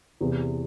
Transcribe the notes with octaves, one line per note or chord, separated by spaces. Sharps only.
E2 C3 E3